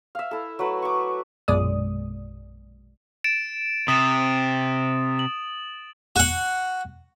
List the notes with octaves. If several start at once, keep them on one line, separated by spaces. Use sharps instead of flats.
E5 F5
E4 A4
F#3 A3 B4
C#6 D6
A#1 F#2 B2 G#3 D5 D#6
A6 D7 E7
C3 D#6 A6 E7
F#7
F#4 F#5